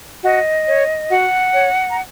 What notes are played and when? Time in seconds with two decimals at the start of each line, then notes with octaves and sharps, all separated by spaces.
0.23 F#4 D#5
0.67 C#5
1.10 F#4 F#5
1.53 C#5
1.90 A#5